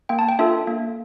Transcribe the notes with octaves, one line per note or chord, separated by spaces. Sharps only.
A#3 G5
A5
G5
D4 F4 A4 E5
A#3